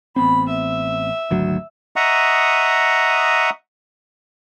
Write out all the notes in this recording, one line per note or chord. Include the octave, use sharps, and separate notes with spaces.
A1 B3 C4 B5
E5
G#1 D2 F#3
D#5 E5 F#5 A#5 C#6 D#6